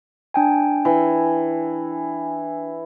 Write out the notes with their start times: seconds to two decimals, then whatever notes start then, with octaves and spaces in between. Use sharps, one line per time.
0.34 D4 G5 G#5
0.85 E3